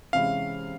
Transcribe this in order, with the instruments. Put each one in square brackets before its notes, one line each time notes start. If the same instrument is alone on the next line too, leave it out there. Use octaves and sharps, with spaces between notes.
[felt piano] C3 E3 G#3 C#4 E4 [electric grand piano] F5